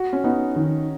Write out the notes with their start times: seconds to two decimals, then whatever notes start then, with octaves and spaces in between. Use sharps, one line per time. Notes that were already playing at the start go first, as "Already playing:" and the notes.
Already playing: F#4
0.13 C#4
0.24 B3 D#4
0.56 D#3